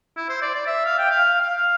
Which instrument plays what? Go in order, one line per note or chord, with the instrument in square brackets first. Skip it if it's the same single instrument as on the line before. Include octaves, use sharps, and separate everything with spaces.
[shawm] E4
C5
D5
D5
E5
F5
G5
F5
F5